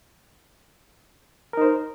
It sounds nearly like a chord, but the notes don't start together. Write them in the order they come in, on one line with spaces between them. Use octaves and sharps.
A#4 D#4 C5